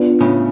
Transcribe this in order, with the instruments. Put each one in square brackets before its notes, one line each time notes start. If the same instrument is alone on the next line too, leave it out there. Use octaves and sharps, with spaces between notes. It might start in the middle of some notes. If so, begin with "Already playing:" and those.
Already playing: [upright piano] B3 D4 F4
[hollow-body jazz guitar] A2 C#3